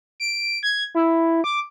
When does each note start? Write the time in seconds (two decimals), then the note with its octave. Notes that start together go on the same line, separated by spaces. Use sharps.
0.20 D7
0.63 G#6
0.95 E4
1.44 D6